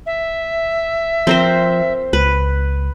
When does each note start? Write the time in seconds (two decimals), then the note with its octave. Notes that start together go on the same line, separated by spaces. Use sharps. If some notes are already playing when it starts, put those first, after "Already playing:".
0.06 E5
1.27 F3 C4 A#4 C5
2.13 C#2 B4